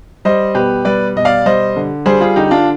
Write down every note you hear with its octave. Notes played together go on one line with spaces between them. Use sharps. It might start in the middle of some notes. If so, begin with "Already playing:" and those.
G3 C5 D#5
B2 G4 B4
G3 B4 D5
B2 D#5
D5 F5
G3 C5 D#5
D3
G3 G#4 C5
F4 G#4
D3 D#4 G4
D4 F4